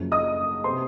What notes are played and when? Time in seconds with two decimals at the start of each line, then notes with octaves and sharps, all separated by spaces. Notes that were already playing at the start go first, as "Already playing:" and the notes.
Already playing: F#1 F#2 F3
0.12 D#5 D#6
0.64 C3 C5 C6